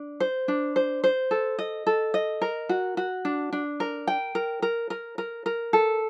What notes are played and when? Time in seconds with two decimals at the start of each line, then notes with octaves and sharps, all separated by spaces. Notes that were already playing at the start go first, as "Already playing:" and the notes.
Already playing: D4
0.20 C5
0.48 D4
0.76 C5
1.04 C5
1.31 A4
1.59 D#5
1.87 A4
2.14 D#5
2.41 A#4
2.69 F#4
2.97 F#4
3.25 D4
3.53 D4
3.80 A#4
4.07 G5
4.35 A#4
4.62 A#4
4.90 A#4
5.18 A#4
5.46 A#4
5.73 A4